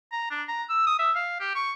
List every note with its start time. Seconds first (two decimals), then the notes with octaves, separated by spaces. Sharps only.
0.12 A#5
0.31 D4
0.48 A#5
0.69 E6
0.87 D#6
0.99 E5
1.15 F5
1.40 G4
1.55 C#6